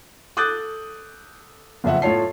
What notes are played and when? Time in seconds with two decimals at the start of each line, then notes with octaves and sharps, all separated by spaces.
0.37 A4 D6 D#6 F#6 G6 A6
1.84 F#1 F2 E5 F#5
2.02 A2 A3 F4 C#5 A5 C7